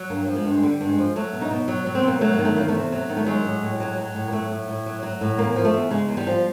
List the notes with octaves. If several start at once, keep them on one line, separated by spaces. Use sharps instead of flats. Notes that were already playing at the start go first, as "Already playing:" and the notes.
Already playing: F#3
G2 A#3
F3
G#3
G2
G#3
D3 G3
G2
G#3
F3
F#3 A3
B2
D#4
B2
F#3
F#3
C4
B2 A#3
F#3 A3
A#3
D#3
A3
E2 A#3
A3
C3
F#3
D#3
A3
F#3 G#3
A2
A2
F#3
F#3
A2
A#3
F#3 A3
A2
A2
F#3
F#3
A2
E2 A#3
F3
A3
E2
C#3 G#3
E2
G3
F3